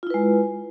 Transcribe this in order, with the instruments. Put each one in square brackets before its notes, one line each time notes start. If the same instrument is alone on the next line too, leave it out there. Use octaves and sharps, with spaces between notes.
[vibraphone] F4
E4
B4
G#3